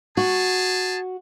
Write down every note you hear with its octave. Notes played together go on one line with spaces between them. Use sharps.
F#4 G#4 A5